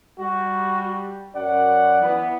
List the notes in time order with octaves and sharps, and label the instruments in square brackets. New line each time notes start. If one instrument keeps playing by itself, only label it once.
[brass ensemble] G3 [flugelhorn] F#4
[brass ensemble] F#2 F#5 [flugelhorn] D5
[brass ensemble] E3 B3